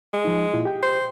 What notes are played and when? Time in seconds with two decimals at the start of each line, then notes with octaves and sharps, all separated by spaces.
0.13 G#3
0.25 F3 D#4
0.53 A#2 E4 F4
0.65 G4 G5
0.82 C5